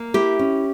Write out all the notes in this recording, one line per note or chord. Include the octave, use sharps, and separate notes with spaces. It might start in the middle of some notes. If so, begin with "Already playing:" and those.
Already playing: A#3
E4 G4
C#4